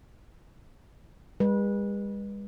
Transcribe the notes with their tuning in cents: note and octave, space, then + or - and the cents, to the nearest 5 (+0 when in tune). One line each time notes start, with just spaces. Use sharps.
G#3 -45 B4 -25